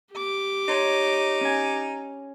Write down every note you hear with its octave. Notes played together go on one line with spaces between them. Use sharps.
G4 D6
D#4 C#5 C6
C#4 G#5